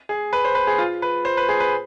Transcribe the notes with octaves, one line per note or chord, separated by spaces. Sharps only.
G#4
B4
C5
B4
G#4
F4
B4
C5
B4
G#4
B4